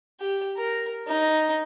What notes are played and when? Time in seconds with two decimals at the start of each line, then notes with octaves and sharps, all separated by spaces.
0.20 G4
0.57 A#4
1.07 D#4